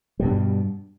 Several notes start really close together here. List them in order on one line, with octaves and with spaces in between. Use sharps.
G3 B2 G2